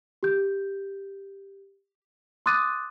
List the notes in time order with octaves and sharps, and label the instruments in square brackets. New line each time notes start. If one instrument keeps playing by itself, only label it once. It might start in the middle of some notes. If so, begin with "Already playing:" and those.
[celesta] G4 G6
C6 D6 D#6 F#6 A6 D#7